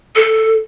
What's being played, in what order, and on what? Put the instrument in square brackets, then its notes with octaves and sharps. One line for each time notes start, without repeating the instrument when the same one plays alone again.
[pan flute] A4